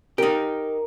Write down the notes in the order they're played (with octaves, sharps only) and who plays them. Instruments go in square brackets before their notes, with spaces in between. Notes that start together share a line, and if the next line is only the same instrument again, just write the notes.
[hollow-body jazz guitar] D#4 G4 [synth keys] A#4